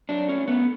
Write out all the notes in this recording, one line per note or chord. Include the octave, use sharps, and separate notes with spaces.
F#3 D4
A3 C#4
A3 B3